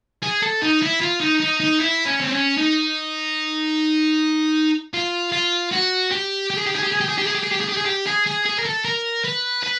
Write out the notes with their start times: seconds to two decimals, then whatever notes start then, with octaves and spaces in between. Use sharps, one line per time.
0.22 G#4
0.42 A4
0.62 D#4
0.82 E4
1.01 F4
1.21 D#4
1.40 D#4
1.60 D#4
1.80 E4
2.06 C#4
2.21 C4
2.32 C#4
2.57 D#4
4.94 F4
5.32 F4
5.72 F#4
6.11 G4
6.50 G4
6.58 G#4
6.66 G4
6.76 G#4
6.83 G4
6.92 G#4
7.01 G4
7.09 G#4
7.18 G4
7.27 G#4
7.35 G4
7.43 G#4
7.51 G4
7.60 G#4
7.69 G4
7.77 G#4
7.86 G4
8.06 G#4
8.26 G#4
8.45 G#4
8.59 A#4
8.65 A4
8.85 A#4
9.24 B4
9.63 B4